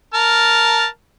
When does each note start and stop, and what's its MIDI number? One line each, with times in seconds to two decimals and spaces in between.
0.14 0.85 70
0.14 0.85 81
0.14 0.85 89